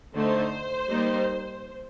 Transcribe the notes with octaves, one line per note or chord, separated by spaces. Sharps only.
D3 A3 D#4 C5
G3 A#3 D#4